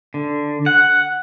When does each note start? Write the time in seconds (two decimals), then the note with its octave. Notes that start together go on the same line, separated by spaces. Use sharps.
0.14 D3
0.66 F#5